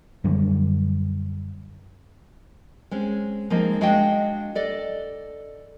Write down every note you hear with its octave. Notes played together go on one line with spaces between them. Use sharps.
F#2 D3 F#3 G3
G#3 C4 C#4
F3 G#3 A#3 C4 D#4
G#3 D4 F#4 D#5 F5 G5
A4 D5 D#5